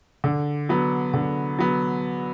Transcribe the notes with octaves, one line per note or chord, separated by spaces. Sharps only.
D3
F#3 B3
D3
F#3 B3